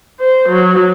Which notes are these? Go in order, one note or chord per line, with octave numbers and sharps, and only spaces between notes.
C5
F#3